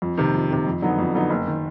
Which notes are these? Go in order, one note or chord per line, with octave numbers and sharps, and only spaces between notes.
F2
C3 D#3
F2
C3 D#3
F2
D3 F#3 B3 D#4
F2
D3 F#3 B3 D#4
F#1
D#3